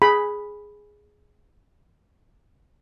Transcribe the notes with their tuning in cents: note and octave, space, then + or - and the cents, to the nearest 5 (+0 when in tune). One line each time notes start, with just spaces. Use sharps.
G#4 +0 B5 +0